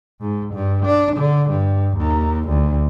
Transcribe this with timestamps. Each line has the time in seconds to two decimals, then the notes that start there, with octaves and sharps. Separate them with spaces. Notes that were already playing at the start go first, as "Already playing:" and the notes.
0.21 G#2
0.54 G2
0.85 D4
1.17 D3
1.50 G2
1.97 D#2
2.48 D2